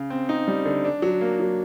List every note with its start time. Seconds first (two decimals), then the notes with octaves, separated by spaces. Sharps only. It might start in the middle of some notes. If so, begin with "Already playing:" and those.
Already playing: C#3
0.10 C4
0.29 D#4
0.48 G3
0.66 D3
0.84 D4
1.02 F#3
1.21 A#3
1.40 F#3